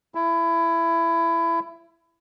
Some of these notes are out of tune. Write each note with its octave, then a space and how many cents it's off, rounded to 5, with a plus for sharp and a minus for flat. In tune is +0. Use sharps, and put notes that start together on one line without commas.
E4 +20